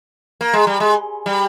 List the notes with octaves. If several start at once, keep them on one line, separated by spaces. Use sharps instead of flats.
A#3
G#3
G3
G#3
G3